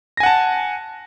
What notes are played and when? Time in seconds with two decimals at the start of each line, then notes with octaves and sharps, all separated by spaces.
0.17 A#6
0.20 G#5
0.23 F#5
0.26 A5